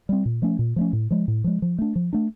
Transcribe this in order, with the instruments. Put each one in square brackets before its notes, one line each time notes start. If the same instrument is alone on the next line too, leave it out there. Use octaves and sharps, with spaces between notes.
[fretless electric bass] G3 C4
A#2
F3 A3 C#4
A#2
F3 A3 C#4
A2
F3 G#3
A2
F3 G#3
F3
A3 D4
F3
A3 D4